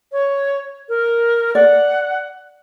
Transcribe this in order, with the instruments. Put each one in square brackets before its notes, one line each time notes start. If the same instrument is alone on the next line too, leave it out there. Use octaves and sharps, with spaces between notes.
[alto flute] C#5
A#4
[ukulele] D5 [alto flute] F#5